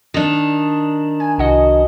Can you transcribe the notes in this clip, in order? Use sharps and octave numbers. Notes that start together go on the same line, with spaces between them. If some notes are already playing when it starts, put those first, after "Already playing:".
D#3 D4
G#5
C2 F#4 D#5